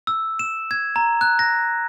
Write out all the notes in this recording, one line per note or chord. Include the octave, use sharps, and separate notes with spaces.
E6
E7
G#6
A#5
F#6
A#6